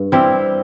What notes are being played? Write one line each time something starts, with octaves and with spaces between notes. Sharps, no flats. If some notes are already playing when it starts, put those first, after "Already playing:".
Already playing: G2
G3 C4 E4